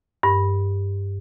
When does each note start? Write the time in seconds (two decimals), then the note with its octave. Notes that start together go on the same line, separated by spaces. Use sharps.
0.23 G2